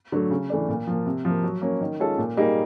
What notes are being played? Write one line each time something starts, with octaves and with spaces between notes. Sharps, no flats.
D3 F#3 A3
C#3
E3 A3 D4
A#2
F3 A#3
C3
F3 A#3
F#3
A#3 C#4
D#3
G#3 C#4 F4 A4
A#2
G3 A#3 D#4 G#4